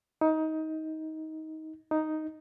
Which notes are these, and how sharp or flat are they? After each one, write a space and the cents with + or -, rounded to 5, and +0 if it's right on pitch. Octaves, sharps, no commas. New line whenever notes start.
D#4 +20
D#4 +0